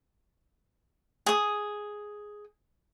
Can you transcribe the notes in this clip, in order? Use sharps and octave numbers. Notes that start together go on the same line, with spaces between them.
G#4 D#6